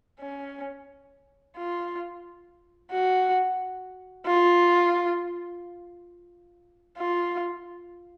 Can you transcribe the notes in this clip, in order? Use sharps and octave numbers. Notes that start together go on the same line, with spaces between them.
C#4
F4
F#4
F4
F4